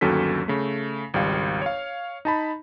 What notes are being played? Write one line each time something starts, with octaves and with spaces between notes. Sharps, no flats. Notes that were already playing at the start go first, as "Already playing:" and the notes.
G1 D#2 F#3 C#4 A4 B6
C#3 A3
G#1 C#2 G3 F5
C#5 F5
D#4 A5 B5